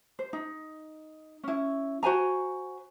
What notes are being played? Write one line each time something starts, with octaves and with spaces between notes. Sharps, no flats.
C5
D#4
C#4 E4
F#4 C5 G#5 A#5